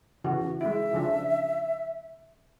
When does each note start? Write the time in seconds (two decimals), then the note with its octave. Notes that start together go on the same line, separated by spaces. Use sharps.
0.24 C#3 E3 F#4
0.61 G#3 E4 E5
0.93 C#3 F3 D4